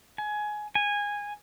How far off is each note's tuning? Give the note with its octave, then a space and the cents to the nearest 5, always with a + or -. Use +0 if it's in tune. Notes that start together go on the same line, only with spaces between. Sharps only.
G#5 +15
G#5 -15